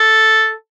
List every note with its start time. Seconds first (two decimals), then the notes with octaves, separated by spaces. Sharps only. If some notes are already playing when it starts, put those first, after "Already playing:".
Already playing: A4